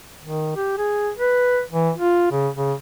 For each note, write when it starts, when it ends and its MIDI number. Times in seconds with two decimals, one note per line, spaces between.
0.22 0.54 51
0.56 0.76 67
0.78 1.11 68
1.17 1.61 71
1.70 1.91 52
1.97 2.31 65
2.31 2.49 49
2.56 2.73 49